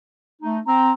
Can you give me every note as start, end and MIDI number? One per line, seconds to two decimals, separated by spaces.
0.42 0.59 57
0.42 0.59 63
0.67 0.92 60
0.67 0.91 82